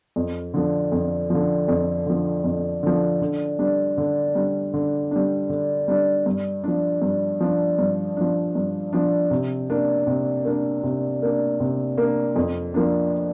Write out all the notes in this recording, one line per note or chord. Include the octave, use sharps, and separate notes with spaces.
F2
D3 F3
F2
D3 F3
F2
D3 F3
F2
D3 F3
D3
G3 D4
D3
G3 D4
D3
G3 D4
D3
G3 D4
G2
F3 D4
G2
F3 D4
G2
F3 D4
G2
F3 D4
C3
A#3 D4
C3
A#3 D4
C3
A#3 D4
C3
A#3 D4
F2
F3 A#3 D4